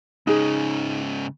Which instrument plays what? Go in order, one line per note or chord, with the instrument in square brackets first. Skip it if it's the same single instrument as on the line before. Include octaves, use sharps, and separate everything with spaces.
[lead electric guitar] G#2 C#3 [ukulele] D#4 G#4